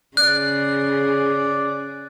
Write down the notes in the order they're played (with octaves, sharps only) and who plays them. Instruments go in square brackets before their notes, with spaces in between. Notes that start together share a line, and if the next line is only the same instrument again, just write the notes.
[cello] C#3 G#4 [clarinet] D5 [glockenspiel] F#6